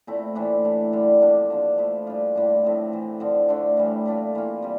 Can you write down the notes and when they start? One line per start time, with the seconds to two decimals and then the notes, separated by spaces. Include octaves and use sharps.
0.07 A#2 A3 C4 E4
0.35 A2 E3 A3 D4
0.65 E3 A3 E4
0.93 D3 G3 D4
1.21 C3 F3 A#3 D4
1.50 D3 F3 A#3
1.78 F3 A3 E4
2.07 A#2 G3 D4 F4
2.35 A2 G3 A#3 D4
2.63 A2 F3 A3 C4
2.92 A2 E3 A3
3.20 D3 F3 C4
3.49 D3 A3 D4
3.77 A2 E3 G3
4.06 A#2 A3 D4 F4
4.35 E3 A#3 F4
4.62 C3 G3